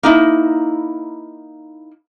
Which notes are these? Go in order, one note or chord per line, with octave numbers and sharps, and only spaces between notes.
A#3 D#4 E4